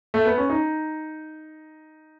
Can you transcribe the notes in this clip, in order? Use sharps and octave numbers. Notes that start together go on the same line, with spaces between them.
A3
B3
C#4
D#4